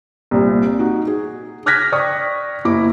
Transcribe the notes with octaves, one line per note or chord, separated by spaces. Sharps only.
C2 A#2
D#4 F#4
G#4
D6 F6 F#6 G#6 A#6 B6
D5 G5 C#6 D#6
F#1 E4 D6